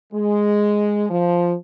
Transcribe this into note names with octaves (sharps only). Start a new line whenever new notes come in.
G#3
F3